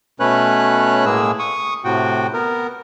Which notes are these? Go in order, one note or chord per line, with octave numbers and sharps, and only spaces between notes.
B2 A3 C#4 B4 C#5 F#6
A2 G#3 A#3 G#4 E6
C#6 D#6
A2 C3 F#4 G5
B3 A#4